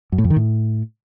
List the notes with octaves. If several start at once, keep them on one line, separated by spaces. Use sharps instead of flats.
F#2
A2
F2
D#3
A2